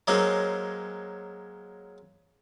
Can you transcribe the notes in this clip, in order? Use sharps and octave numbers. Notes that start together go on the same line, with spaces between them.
F#3 G#3 A#3 C4 C#4